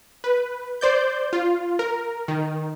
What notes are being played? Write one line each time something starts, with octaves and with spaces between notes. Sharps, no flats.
B4
C5 D5 G6
F4
A#4
D#3